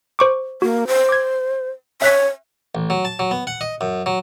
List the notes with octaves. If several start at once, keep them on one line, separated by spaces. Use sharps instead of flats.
C5 C#6 D6
A#3 F#4
C5
D6 G#6
C#5 E5 F#6 B6
A1
F#3
A5
F#3
B3
F#5
D#5
F#2
F#3